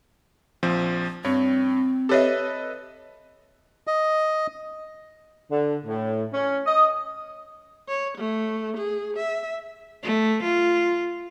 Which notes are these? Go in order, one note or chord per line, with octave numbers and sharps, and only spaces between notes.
A#1 F3 C4
G2 C4 C#5
G4 A4 B4 C#5 D#5 E5
D#5
D3
A2
C#4
D#5
C#5
A3
G#4
E5
A3
F4